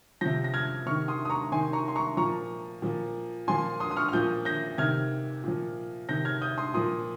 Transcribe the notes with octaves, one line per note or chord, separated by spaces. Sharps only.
C3 F3 G6 A#6
A#6
F6 G#6
C3 D#3 C#6 F6
C6 D#6
D#6
A#5 C#6
C3 D#3 G#5 C6
A#5 C#6
C6
A#5 C#6
A#2 F3 A#5 C#6
A#2 F3
A#2 F3 G#5 C6
C6 D#6
D#6
C#6 F6
F6
A#2 F3 D#6 G6
G6 A#6
C3 D#3 F6 G#6
A#2 F3
C3 D#3 G6 A#6
F6 G#6
D#6 G6
C6 D#6
A#2 F3 C6 D#6